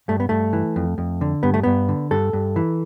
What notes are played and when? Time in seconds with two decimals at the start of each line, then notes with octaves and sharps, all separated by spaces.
0.08 G2 A3
0.20 B3
0.29 G2 A3
0.53 E3
0.76 F2
0.98 F2
1.21 D3
1.43 G2 B3
1.54 A3
1.63 G2 B3
1.89 D3
2.11 G2 A4
2.33 G2
2.56 E3